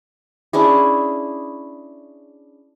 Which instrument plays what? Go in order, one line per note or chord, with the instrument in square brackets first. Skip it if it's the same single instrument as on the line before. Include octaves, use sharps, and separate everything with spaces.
[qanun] C#4 D4 E4 G#4